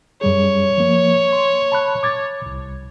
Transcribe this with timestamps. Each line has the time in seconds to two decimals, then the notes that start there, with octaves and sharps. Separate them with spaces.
0.21 F#2 G3 G#4 C#5
0.78 F3 A#3
1.33 C6
1.72 A5 B5 F#6
2.03 D6 G#6 A6
2.46 C2